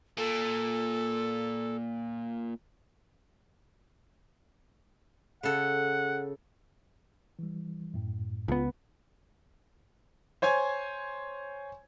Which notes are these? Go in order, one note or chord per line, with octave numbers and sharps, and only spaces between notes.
A#2 A4
C#3 A4 F#5
E3 G3
F#2 A2
C#2 B3 F4
C5 C#5 G#5 G#6